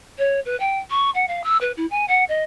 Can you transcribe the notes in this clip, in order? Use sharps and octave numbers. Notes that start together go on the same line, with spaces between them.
C#5
B4
G5
C#6
F#5
F5
E6
B4
E4
G#5
F#5
D#5